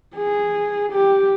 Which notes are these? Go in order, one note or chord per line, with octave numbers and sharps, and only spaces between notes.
G#4
G4